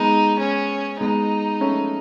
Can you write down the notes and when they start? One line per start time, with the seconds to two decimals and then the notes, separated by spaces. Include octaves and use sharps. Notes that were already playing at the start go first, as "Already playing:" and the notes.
Already playing: G#3 B3 D#4
0.40 C#4
1.00 G#3 B3 D#4
1.61 A3 C#4